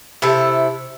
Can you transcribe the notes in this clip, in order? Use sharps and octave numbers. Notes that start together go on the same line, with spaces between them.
C3 E4 A4